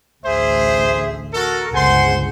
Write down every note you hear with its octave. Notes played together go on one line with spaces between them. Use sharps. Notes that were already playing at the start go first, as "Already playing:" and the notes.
A1 D2 G#4 C5 E5
F#4 A4 A#4
G1 C#2 C5 F#5 G#5 C6